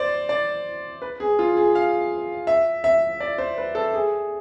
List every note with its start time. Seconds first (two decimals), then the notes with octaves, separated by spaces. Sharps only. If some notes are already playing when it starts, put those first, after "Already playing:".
Already playing: C5 D5
0.29 D5
1.02 B4
1.20 G#4
1.39 F4
1.57 G#4
1.75 F5
2.47 E5
2.84 E5
3.20 D5
3.38 C5
3.58 B4
3.75 A4
3.94 G#4